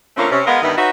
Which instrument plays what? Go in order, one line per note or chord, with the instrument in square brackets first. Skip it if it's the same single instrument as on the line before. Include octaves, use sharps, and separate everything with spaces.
[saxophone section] D3 F3 A3 A#3 C4 C#4
C3 C#4
G#3 B3 A#4 D#5 F5
G2 D#3 E3 B3 D#4 E4
D#4 F#4 B4 C#5 E5